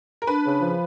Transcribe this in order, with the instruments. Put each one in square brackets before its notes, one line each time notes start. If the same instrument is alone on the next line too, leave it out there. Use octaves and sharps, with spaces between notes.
[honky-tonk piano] A#4
[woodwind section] D4 [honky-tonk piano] B4
[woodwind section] C#3
F3